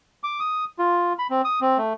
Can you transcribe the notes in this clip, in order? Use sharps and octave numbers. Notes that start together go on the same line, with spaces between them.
D6
D#6
F4
B5
C4
D#6
C4
A3